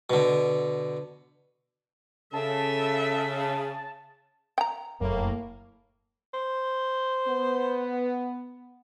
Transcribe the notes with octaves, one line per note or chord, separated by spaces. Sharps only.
B2 D3
C#3 C#4 A4 E5 A5
G5 A#5
F1 F#2 A2 A#3
C5
B3